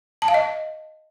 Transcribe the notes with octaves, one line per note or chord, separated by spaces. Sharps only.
A5
F5
D#5